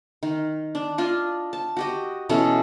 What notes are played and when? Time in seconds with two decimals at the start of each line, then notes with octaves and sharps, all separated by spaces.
0.23 D#3
0.75 D4
0.98 D4 F4 D#5
1.53 A5
1.77 F#4 G4 D#5
2.29 B2 E3 C#4 A4